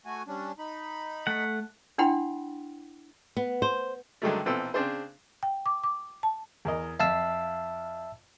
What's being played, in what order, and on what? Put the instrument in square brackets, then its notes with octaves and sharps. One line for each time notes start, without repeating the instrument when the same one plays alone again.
[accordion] A3 F#4 G#5
G3 C#4 D4
D#4 B5
[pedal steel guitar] A3 F#5
[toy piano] D4 E4 F#5 G5 B5 C6
[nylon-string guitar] B3
C5
[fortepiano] G2 D3 D#3 F#3 G#3 A3
A#1 B2 E3 C4 A4 E6
C#3 C4 D4 G#4 C5
[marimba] G5
D6
D6
A5
[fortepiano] E2 A#4 D#5
[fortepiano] F2 F5 [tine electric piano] E5 A5 E6